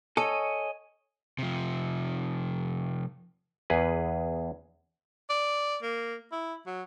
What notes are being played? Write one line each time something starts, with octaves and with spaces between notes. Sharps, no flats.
A4 C#5 D#5 G#5
C3 F3
E2 G#4 B4
D5
A#3
E4
F#3